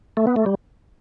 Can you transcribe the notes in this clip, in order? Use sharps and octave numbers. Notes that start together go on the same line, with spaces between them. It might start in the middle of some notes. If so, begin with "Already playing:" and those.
A3
B3
A3
G3